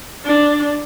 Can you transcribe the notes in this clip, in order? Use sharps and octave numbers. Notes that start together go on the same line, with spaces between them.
D4